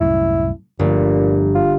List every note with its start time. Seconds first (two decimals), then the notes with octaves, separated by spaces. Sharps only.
0.01 C2 F#2 A2 E4
0.79 G1 G2 A#2 F3 A3
1.55 F4